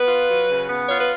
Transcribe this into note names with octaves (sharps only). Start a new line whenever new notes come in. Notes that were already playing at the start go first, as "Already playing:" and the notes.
Already playing: B3 B4
F4
F#3
C#3
B3
F4 C#5
B4